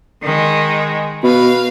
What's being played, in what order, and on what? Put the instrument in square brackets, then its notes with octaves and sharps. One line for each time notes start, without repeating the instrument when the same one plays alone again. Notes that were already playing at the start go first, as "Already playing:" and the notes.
[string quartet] D#3 G#3
[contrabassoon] B2 [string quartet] B4 F5